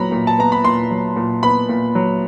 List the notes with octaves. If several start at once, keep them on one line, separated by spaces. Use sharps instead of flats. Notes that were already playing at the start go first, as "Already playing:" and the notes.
Already playing: A#2 F#3 B3 A#5 B5
A#2
A5
B3 A#5
B5
A#2 C6
F#3
A#2
B3 B5
A#2
F#3